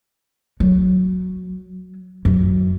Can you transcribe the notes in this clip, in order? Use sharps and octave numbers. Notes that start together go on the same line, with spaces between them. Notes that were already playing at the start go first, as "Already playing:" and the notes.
F#3
F#2